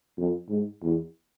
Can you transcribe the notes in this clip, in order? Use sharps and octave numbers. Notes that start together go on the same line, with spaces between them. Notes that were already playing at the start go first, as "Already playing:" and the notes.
F2
G#2
E2